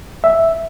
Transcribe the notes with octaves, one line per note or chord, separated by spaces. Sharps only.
E5